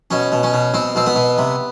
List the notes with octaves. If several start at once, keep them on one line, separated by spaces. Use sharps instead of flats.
B2 C#4
B2
C#4
B2
B2 C4
B2 C4
B3
B2
C3